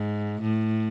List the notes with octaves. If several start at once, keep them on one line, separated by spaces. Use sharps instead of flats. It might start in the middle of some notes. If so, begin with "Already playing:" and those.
Already playing: G#2
A2